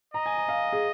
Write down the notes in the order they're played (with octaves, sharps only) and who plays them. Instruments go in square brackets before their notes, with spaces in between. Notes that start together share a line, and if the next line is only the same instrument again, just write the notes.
[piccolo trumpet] D#5 [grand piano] A#5
[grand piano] G#5
A#5
F5
G#4